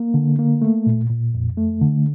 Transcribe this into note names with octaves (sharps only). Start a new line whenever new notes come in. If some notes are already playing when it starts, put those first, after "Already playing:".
Already playing: A#3
D3
A#3
A3
A#2
A#2
F2
A3
D3